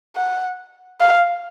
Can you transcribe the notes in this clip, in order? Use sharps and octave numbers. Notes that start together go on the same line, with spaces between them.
F#5
F5